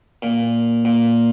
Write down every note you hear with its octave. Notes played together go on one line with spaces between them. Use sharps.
A#2
A#2